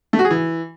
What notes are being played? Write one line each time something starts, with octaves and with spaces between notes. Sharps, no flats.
A3
F#4
G#4
E3